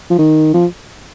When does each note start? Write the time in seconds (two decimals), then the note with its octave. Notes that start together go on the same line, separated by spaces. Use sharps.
0.10 F3
0.19 D#3
0.54 F3